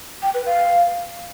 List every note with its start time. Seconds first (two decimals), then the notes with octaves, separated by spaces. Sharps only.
0.22 G5
0.34 B4
0.46 F5